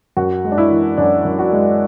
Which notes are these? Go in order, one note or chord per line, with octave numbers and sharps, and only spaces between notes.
F#2 F#4
G#3
D4
E4
E3
F#2 D4
F#2
F#4
G#3